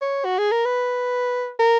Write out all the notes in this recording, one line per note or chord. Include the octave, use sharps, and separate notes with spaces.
C#5
F#4
G#4
A#4
B4
A#4